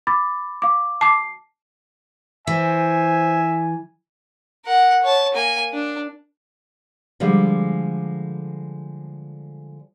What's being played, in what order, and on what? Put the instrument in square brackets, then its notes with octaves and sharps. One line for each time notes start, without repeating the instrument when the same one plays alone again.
[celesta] B5 D6 A6
F5 D6
[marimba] A5 D6 [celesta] C7
[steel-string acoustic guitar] E3 [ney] C5 [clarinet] E5 [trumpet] G#5
[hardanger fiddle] A#4 F#5
C#5 A5
A#3 G#5
D4
[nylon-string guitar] D3 F3 G3 G#3